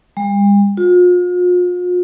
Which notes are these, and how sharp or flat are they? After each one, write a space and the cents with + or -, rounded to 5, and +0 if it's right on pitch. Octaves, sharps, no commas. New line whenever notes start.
G3 +45
F4 +40